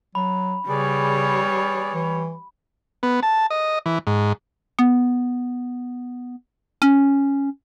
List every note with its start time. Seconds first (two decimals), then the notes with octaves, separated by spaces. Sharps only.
0.15 F#3 B5
0.68 C#3 G3 G#4 B4 C#5 D5
1.94 E3
3.03 B3
3.23 A5
3.50 D#5
3.86 E3
4.07 G#2
4.79 B3
6.82 C#4